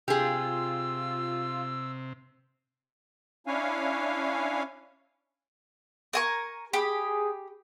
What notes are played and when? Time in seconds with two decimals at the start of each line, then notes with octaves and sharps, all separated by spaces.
0.08 C3 F4 G4 G#4 E6
3.47 C#4 D4 E4 C#5 F5 G#5
6.13 A#4 G#5 C#6
6.73 G4 G#4 B5